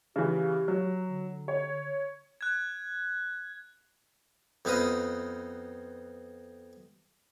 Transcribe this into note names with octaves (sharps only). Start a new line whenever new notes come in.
C#3 E3 G4
F#3
D3
C#5
F#6 G#6
F2 B3 D#4 F4 B5 D#6